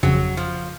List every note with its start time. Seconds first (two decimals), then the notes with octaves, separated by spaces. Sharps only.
0.03 G1 F2 C#3 F#3
0.37 F3